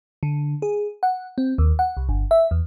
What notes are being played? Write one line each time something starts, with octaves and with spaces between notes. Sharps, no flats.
D3
G#4
F#5
C4
D#2
F#5
C2
G1
E5
E2